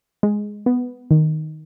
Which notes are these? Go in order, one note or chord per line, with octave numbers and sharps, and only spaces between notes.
G#3
B3
D#3